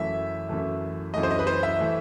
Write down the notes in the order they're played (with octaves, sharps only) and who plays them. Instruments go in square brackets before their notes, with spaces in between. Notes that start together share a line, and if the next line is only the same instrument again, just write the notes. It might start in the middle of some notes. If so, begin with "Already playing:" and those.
Already playing: [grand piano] F#2 E3 A3 E5
F#2 E3 A3
F#2 E3 A3 D#5
C5
D#5
B4
C5
E5
E3 A3